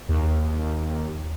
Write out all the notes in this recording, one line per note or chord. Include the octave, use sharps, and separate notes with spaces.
D#2